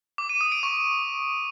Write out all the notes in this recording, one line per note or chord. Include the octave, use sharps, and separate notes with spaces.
D6
D#7
D#6
D7
C#6